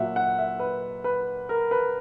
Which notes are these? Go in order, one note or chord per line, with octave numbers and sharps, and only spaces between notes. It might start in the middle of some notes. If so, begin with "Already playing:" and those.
Already playing: A#2 F#3 E5 F#5
F#5
E5
B4
B4
A#4
B4